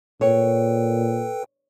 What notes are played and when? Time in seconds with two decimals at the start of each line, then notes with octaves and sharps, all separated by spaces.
0.21 A#2 A4 B4 C#5 G5